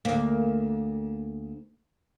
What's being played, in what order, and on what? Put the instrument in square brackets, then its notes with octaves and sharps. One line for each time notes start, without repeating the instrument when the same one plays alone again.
[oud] D2 A#3